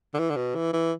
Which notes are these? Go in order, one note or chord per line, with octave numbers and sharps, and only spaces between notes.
D3
E3
D3
B2
E3
E3